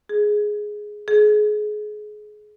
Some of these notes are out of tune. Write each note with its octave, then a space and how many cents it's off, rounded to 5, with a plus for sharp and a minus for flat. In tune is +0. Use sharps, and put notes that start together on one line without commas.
G#4 +5
G#4 +25